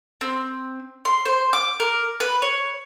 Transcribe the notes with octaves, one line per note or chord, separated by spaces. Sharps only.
C4
C6
C5
D6
A#4
B4
C#5